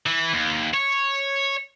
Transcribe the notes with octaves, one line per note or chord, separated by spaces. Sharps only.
E3
D#2
C#5